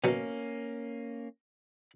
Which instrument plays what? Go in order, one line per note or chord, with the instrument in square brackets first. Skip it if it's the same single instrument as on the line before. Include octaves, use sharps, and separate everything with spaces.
[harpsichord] B2 F#3 [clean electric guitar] A#3 C#4